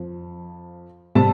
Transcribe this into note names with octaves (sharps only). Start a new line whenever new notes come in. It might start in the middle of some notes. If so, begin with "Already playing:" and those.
Already playing: F2 F3
C3 G3 A5